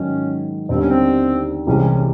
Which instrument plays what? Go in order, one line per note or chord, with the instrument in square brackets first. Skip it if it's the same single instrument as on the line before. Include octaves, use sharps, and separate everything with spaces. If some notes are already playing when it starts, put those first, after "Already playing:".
Already playing: [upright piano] G#2 D#3 F#3 [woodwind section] C#4
[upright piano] D#2 D3 G3 B3 D4 [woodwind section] C4
[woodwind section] C#4
C4
[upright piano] C2 C3 E3 G#3 [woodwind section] C#4
[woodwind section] C#4
C#4